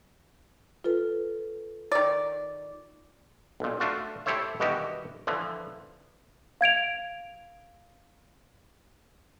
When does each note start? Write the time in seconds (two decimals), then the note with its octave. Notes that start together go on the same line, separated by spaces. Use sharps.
0.84 F4 A4 B4
1.92 D#3 D5
3.60 B1 A#2
3.80 A3 D4 F4 F#4
4.26 E4 G4 A4 C5 C#5 E5
4.60 G2 B2 D#3 E3 F#4 G4
5.27 D3 E3 F3
6.61 F5 G#6 D7 F7